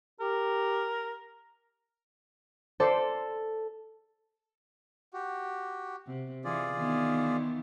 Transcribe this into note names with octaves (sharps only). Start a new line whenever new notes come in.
G4 A#4
A4 C5 D5
F#4 G4
C3
E3 F4 G#4 D5
D#3 E3 B3